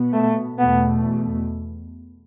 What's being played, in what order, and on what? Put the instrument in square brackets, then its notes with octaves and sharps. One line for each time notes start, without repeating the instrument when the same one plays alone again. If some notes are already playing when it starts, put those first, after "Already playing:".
Already playing: [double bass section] B2 B3
[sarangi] A3
[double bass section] E2 B2 A3 [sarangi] B3